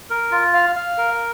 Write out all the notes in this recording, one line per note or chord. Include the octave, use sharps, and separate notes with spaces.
A#4
F4
F5
F5
A#4